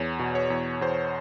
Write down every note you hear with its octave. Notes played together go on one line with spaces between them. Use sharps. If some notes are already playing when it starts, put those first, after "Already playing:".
Already playing: E2 C#5
B2
C#5
E2
E2 C5